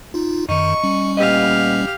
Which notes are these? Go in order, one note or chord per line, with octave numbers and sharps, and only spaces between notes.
D#4 F4
F#2 D#3 D#4 C#6
G3 C#4
A#2 B3 G4 D#5 F5